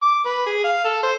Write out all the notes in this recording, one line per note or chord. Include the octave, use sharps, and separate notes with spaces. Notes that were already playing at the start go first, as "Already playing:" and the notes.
D6
B4
G#4
F5
A4
C5